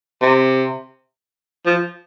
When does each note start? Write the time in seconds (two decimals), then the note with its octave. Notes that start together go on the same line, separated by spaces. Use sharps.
0.21 C3
1.66 F3